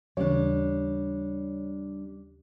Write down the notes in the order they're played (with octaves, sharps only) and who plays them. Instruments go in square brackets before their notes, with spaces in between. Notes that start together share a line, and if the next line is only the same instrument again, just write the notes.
[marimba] D#2 C#3 E3 [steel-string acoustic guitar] G3 D4 [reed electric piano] C#5